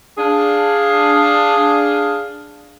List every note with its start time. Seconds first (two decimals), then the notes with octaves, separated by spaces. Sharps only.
0.18 D4 G#4 F5